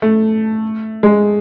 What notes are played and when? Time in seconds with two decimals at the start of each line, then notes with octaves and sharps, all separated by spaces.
0.02 A3
1.03 G#3